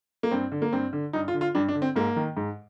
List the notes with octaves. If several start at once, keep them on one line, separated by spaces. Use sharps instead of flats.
A#3
G2 C4
D3
A#3
G2 C4
D3
G2 D#4
F4
D3
F4
G2 D4
D4
D3
C4
G#2 A#3
D#3
G#2